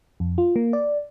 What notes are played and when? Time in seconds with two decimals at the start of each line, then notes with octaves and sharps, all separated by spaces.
0.20 F2
0.38 F4
0.56 A#3
0.73 D5